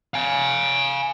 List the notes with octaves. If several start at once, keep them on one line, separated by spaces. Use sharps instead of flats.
F5 G#5